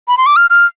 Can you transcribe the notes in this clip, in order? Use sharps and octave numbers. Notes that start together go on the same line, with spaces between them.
B5
C6
D6
F6
F6